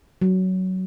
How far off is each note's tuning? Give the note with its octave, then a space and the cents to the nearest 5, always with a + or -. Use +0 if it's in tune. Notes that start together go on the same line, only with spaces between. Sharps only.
F#3 +10